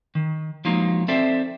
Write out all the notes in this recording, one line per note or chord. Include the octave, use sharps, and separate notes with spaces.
D#3
F3 F#3 G#3 A#3 D#4
C4 A4 C5 D5 E5